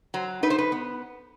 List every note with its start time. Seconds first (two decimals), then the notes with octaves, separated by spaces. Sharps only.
0.14 F#3 C5
0.43 D#4 B4
0.50 C5
0.58 B4
0.72 B3